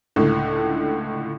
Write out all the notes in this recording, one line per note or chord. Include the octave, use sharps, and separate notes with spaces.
C#2 A2 D3 A3